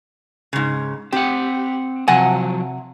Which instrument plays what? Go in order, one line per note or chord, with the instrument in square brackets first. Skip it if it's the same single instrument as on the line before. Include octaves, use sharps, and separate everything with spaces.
[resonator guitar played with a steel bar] G#2 C#3
[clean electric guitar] C4 F#5 [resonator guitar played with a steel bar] G4
[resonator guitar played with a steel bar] C3 F#5 G#5 [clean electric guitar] F3 F#3